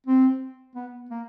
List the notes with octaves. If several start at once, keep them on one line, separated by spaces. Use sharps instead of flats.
C4
B3
A#3